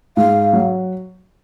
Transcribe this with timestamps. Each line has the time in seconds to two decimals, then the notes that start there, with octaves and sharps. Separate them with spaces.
0.17 G#2 F5
0.53 F#3